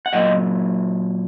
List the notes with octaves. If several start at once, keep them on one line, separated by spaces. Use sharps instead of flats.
F#5
A#2 F#3 A#3 D#5 G5